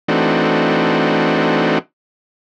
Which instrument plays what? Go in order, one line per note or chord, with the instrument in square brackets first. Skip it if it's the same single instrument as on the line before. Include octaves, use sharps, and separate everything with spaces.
[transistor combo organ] E3 A3 C4 D4 D#4 F#4